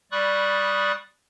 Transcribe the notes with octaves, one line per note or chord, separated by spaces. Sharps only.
G3 D5 B5 C#6 D#6 F#6